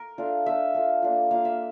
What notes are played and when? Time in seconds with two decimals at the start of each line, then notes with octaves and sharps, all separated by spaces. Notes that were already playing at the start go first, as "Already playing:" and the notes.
Already playing: A#4
0.18 A3 D4 F4
0.46 A3 D4 F4 E5
0.74 A3 D4 F4
1.02 A#3 D4 F4
1.31 A#3 D4 F4 F5
1.45 E5